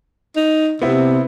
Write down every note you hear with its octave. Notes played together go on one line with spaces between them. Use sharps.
D#4
C3 B3 C4 E4